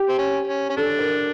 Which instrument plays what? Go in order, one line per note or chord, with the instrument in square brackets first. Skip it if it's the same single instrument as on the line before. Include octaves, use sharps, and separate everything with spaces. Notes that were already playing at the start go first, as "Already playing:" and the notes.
Already playing: [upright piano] G4
[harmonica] C4
C#4
C#4
C#4
[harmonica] D4 [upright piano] A4
[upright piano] A#4